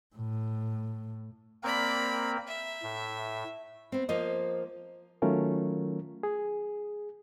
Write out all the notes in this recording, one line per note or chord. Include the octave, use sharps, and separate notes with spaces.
A2
A#3 C4 A#4 D5 B5
E5
A2
B3 C4
F3 A#3 C5 D#5
D#3 F#3 A3 C#4 F4 A#4
G#4